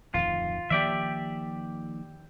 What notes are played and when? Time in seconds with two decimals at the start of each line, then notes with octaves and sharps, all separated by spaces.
0.14 D1 F2 D#3 F4
0.70 D#3 F3 A#3 G4 D5 E5